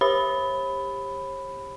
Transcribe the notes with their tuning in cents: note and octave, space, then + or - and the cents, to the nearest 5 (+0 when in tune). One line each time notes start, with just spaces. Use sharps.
G4 +20 C#5 -45 B5 +10